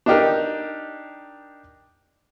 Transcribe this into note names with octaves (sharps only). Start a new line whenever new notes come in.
D4 D#4 G4 A#4